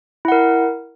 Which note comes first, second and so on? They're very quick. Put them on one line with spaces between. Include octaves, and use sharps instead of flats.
E4 F#5 A#4